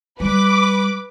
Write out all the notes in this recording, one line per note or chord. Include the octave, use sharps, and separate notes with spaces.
G3 B4 D6